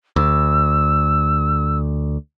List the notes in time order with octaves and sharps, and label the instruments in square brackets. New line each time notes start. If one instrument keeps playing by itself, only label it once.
[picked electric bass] D2 [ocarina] E6